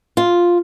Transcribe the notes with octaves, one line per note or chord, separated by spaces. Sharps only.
F4